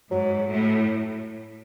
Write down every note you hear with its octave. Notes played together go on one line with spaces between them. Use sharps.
G#2 F#3
A2